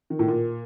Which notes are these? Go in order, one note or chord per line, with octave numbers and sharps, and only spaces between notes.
D#3
A2
A#2